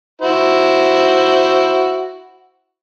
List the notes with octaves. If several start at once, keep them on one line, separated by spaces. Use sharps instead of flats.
E4 F#4 C5